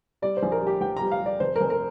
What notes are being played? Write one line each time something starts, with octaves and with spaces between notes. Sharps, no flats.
G3 D5
C5
A#1
A#4
G3
G4
A#1 G5
G3 A#5
F5
G3
D5
F1 C5
A#4
F1
A#4